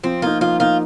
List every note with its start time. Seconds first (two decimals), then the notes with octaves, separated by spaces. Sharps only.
0.04 F3 C4
0.22 A#3 D#4 F4
0.41 F3 F4
0.60 A#3 D#4 F4